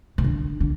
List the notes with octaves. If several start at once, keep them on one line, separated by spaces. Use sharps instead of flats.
C#3
D3
D3